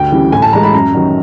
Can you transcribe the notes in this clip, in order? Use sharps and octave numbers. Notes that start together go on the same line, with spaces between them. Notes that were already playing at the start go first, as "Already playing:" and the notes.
Already playing: D2 G5
C#3 E3 G3
A2 G#5
A5
E3 G#3 A#5
B5
F#2 A#5
D#3 F#3